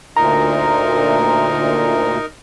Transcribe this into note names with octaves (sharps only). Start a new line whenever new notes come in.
D2 A#2 D#4 A#4 A#5